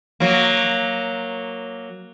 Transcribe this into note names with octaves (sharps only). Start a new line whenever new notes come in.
F#3 A#3